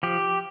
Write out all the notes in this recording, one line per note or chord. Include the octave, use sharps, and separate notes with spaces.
F3 G4